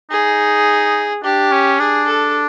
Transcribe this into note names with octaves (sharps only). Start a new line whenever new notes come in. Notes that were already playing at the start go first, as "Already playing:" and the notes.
D#4 G#4
D4 G4
C#4
D4 G#4
A4